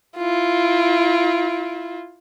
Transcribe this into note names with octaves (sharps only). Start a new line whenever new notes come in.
E4 F4